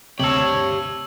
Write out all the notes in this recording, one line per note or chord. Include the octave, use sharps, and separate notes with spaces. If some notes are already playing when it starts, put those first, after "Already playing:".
D2 C3 G4 C#5 A5 E6 F#7